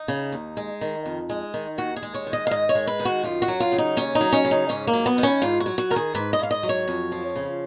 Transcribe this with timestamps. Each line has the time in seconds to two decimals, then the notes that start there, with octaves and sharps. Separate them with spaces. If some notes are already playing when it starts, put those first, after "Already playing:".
Already playing: D#4
0.08 C#3
0.32 D#2
0.57 G#3
0.81 D#3
1.06 F2
1.30 G#3
1.54 D#3
1.78 D#2 F#4
1.96 G#4
2.03 G#3
2.14 C#5
2.27 D#3
2.33 D#5
2.47 F5
2.51 G#2 D#5
2.69 C#5
2.75 G#3
2.87 B4
3.00 D#3
3.05 F#4
3.23 F#2 F4
3.42 F#4
3.48 F#3
3.60 F4
3.72 C#3
3.78 D#4
3.97 D#2 C#4
4.15 D#4
4.21 F#3
4.33 C#4
4.45 C#3
4.51 D#4
4.69 G#2 C#4
4.87 A#3
4.93 F#3
5.06 B3
5.18 D#3
5.23 C#4
5.42 G#2 F4
5.60 F#4
5.66 F#3
5.78 F#4
5.90 D#3 A#4
5.96 G#4
6.15 G#2 B4
6.33 D#5
6.39 G#2 F5
6.51 D#5
6.63 F#3
6.69 C#5
6.88 F2
7.12 F3
7.36 C#3